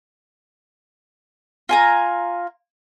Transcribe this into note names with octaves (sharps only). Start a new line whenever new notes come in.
F4 G#5 A#5